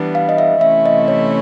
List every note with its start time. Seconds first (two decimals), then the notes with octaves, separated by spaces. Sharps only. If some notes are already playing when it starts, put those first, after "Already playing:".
Already playing: E3 G3 B3 D4
0.15 F5
0.29 D#5
0.38 E5
0.61 C3 E3 A3 C#4 E4 E5
0.86 D#5
1.08 C#5